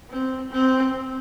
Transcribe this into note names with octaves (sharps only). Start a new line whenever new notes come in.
C4
C4